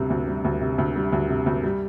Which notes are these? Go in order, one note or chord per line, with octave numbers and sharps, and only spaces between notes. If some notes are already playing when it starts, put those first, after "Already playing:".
Already playing: D2 C3 G3
D2
G3
D2
C3
D2
G3
D2
C3
D2
G3